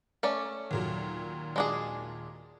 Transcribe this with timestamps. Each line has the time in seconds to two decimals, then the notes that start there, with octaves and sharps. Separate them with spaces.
0.23 A3 C#4 D5
0.71 D#2 A#2 F#3
1.56 G#3 D4 G#4